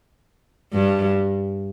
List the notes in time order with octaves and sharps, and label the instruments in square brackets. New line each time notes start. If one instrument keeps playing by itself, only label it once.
[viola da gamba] G2